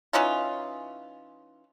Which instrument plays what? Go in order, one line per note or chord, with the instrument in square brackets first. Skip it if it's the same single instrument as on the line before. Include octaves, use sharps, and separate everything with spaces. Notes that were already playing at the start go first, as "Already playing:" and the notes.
[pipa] E3 C#4 D#4 F4